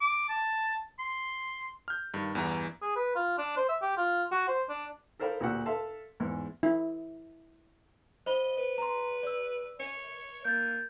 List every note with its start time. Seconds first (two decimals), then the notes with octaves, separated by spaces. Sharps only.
0.01 D6
0.29 A5
0.99 C6
1.88 F6 G6
2.14 G2 D#3
2.35 E2 G2 E3 A#5
2.82 G#4
2.96 B4
3.16 F4
3.38 D4
3.57 C5
3.69 E5
3.82 G4
3.97 F4
4.32 F#4
4.48 C5
4.69 D4
5.19 A4 A#4 C5 D5 F5 B5
5.40 D2 A#2 F#4 G4 F#5 E6
5.66 A4 E5 F5 A5 C6
6.20 E2 G#2
6.63 E4
8.26 C5 D#5 B5 G7
8.58 B4
8.78 A#5 C6
9.23 D5 E6
9.80 C#5 C#7
10.44 A#3 G6 A6